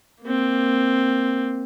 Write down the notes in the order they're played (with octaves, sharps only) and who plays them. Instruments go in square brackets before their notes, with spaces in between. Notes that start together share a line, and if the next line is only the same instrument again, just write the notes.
[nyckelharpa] A#3 C4